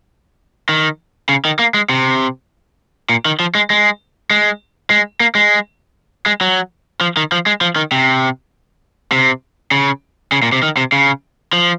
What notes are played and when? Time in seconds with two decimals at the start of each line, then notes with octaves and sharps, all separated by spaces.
0.69 D#3
1.29 C#3
1.45 D#3
1.59 A#3
1.74 G#3
1.89 C3
3.09 A#2
3.25 D#3
3.40 F3
3.55 G#3
3.70 G#3
4.31 G#3
4.91 G#3
5.20 A#3
5.35 G#3
6.26 G#3
6.41 F#3
7.01 F3
7.17 D#3
7.32 F3
7.46 G#3
7.61 F3
7.76 D#3
7.92 C3
9.12 C3
9.71 C#3
10.32 C#3
10.43 A#2
10.53 C3
10.63 D#3
10.77 C3
10.92 C#3
11.53 F3